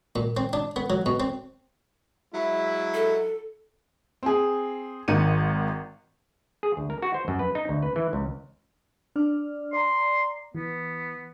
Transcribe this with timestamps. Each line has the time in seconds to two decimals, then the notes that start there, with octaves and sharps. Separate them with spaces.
0.16 A#2
0.37 C4
0.53 D4
0.76 B3
0.90 F#3
1.06 B2
1.20 C4
2.32 F#3 G#3 E4
2.94 A4
4.23 C4 G#4
5.08 G#1 D#3 C#7 D#7
6.63 G#4
6.77 D2
6.90 A#4
7.02 F#4
7.14 C5
7.28 F#2
7.39 B4
7.55 D#4
7.69 D2
7.83 B4
7.96 E3
8.13 C#2
9.16 D4 D5 F6
9.73 D5 A#5 C6
10.55 E3 B3